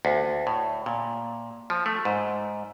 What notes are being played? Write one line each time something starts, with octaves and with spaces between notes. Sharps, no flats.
D2
A2
A#2
F3
A3
G#2